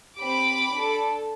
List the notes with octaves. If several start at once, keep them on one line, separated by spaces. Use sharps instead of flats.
C4 G4 B5 D6
D4 A4